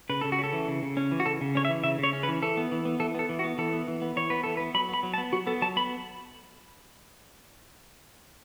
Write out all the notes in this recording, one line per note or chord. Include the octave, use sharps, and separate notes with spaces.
C#3 B4
C#3 A4
F#4
C#4 A4
E3
C#3
C#3
C#4
E3
F#4
C#3 A4
C#3
C#4 C#5
E5
E3
C#3 E5
C#3
C#5
C#4
B4
E3
E3 A4
B3
E3
B3
E3 A4
B3 A4
E3
F#4
B3
E3 A4
B3
E3
B3
E3 C#5
B3 B4
E3 A4
B4
B3
F#3 B5
B3 B5
F#3
A5
B3
F#3 F#4
B3 A4
F#3 A5
B3 B5